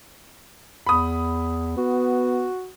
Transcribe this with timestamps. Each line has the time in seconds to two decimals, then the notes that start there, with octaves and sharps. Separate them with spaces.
0.86 E2 B5 D#6
1.77 B3 F#4